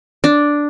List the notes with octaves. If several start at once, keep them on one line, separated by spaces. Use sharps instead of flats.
D4